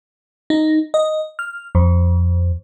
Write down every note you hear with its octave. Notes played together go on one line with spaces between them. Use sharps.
D#4
D#5
F6
F2